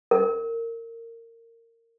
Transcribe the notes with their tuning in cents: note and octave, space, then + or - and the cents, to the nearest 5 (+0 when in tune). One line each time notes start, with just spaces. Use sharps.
A#4 -25